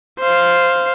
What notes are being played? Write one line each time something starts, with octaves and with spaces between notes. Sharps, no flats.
C5 F5